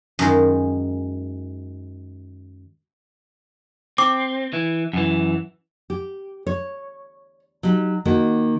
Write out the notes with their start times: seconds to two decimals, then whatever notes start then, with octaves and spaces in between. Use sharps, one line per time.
0.19 F#2 D#3 G#3
3.98 C4 D6
4.53 E3
4.93 F#2 E3
5.90 G4
6.47 C#5
7.63 F#3 D#4 G4
8.05 D#3 A#3 F#4